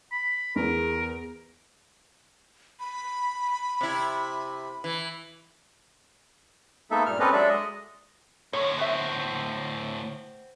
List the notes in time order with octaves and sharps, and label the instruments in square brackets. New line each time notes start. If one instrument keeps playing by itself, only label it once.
[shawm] B5
[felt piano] E2 G#4 [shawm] A#4
[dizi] B5
[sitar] C3 E4
E3
[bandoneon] G#3 A#3 B3 D#4 A4 E5
G2 A#2 F6
C4 C#4 G4 A4 B4 D#5
F#3 G#3 D4 A4 D5 E5
G#3 D#5
[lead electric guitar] D2 A2 [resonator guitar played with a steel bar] C#5
[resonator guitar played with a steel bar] B3 C4 E5